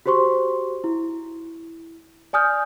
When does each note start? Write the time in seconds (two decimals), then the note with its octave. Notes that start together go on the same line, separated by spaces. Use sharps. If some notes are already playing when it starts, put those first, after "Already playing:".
0.06 F#4 G4 C5 C6 C#6
0.84 E4
2.33 D5 G#5 D#6 F6 G6